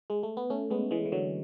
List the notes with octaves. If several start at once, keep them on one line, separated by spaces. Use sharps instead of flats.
G#3
A3
B3
A3 C#4
G#3 B3
E3 G#3
E3
D3 F#3